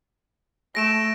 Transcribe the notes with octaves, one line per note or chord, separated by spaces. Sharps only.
A3 A#6 D7 E7